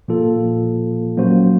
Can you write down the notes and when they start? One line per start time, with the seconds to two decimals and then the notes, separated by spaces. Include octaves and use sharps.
0.08 A#2 F3 A#3 F4 A4
1.17 F#3 A#3 C#4 F#4 C5